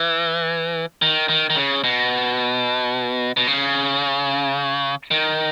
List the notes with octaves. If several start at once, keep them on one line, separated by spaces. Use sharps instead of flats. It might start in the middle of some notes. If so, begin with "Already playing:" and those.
Already playing: E3
D#3
D#3
D#3
C#3
B2
B2
C#3
D#3